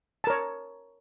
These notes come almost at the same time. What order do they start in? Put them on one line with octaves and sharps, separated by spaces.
A5 A#4 C#5